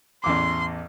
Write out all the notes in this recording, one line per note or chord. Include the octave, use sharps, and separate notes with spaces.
A1 E2 C6 D6